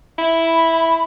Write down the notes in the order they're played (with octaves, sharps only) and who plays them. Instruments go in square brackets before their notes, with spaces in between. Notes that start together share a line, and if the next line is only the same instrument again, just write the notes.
[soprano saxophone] E4 [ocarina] B5